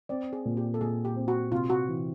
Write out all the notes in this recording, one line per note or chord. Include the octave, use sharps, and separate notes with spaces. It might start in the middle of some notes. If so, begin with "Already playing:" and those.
C4 D5
G#4
A#2
G4
A4
A#2 G#4
G4
C4
F#4
C3 F4
F#4
E3